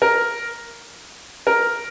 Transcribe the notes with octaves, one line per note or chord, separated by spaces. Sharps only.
A#4
A#4